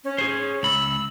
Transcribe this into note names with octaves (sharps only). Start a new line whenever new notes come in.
C#4
G#4 C5
C#2 B5 E6